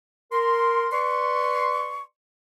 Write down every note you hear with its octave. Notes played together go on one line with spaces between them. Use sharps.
A#4 C6
B4 D5 C6 C#6